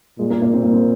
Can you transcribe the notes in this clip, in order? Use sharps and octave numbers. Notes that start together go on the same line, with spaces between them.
A#2 G#3
A#3
A#3
C4
A#3
C4